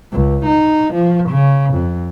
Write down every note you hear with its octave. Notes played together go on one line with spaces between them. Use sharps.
C#2
D#4
F3
C#3
F2